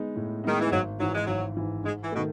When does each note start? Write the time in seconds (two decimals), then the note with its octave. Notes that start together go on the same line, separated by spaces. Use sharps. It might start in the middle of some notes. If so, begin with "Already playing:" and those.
Already playing: G#3 B3 D#4
0.16 A2
0.44 D#3 G#3 B3 D#4
0.60 E3
0.71 G#1 F#3
1.00 G#2 E3 F#3
1.14 G#3
1.27 G#1 F#3
1.57 G#2 E3
1.84 G#2 G#3
2.03 E3
2.12 B2 A3
2.17 D#3